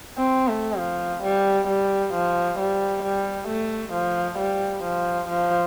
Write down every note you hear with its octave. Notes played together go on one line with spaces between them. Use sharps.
C4
A3
F3
G3
G3
F3
G3
G3
A3
F3
G3
F3
F3